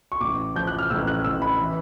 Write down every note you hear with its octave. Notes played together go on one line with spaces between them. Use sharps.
C#6
A1 D6
F3 G6
F#6
F6
A1 E6
F#6
A1 E6
B5
E3